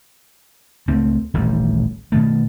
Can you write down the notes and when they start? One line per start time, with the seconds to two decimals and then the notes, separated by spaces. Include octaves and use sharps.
0.88 C#2 A3 C4
1.34 D#1 A1 B2 G3
2.12 B2 D#3 A3